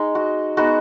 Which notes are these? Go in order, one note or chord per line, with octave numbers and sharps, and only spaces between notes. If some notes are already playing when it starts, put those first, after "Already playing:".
Already playing: G#3 D#4
F#4
G#3 B3 D#4 F#4